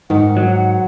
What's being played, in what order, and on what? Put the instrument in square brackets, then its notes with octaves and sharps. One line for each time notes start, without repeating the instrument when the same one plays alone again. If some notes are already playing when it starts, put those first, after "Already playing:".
[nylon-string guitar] G#2 [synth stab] D#3 [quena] F#5
[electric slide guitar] F#3